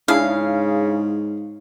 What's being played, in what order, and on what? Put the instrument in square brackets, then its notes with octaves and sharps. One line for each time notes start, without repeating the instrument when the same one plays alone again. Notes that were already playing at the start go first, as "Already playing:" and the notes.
[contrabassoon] G#2 [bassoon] C#3 [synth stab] D4 E4 G#4 [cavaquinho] F5